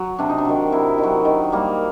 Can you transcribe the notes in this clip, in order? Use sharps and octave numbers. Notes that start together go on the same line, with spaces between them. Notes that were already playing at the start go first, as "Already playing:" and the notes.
Already playing: F#3
C3 D4
D#4
D4
D#3 F#3
C3 E4
D#3
F#3
D#3
G3 A#3